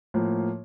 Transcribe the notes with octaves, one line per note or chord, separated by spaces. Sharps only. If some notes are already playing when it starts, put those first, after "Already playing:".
A2 F3 A#3